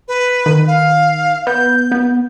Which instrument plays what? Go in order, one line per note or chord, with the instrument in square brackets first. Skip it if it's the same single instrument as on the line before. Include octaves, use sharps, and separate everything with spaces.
[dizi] B4
[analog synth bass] D#3
[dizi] F5
[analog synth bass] B3 [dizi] G6
[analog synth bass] B3